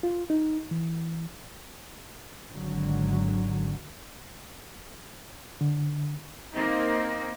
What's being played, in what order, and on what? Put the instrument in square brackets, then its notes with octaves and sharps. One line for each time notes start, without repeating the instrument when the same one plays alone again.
[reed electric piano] F4
D#4
E3
[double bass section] G#1 D3 F#3
[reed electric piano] D3
[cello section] A#3 C4 D#4